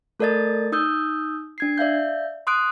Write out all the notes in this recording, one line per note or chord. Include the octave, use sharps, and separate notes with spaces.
A3 A4 A#4 D5 D#5 A6
D#4 D#6 E6 G6
D4 G#6 C7
D5 E5 F5 G6
C6 D#6 F#6 D7